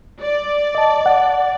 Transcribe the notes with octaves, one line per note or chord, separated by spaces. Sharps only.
D5
D#5 A5
F#5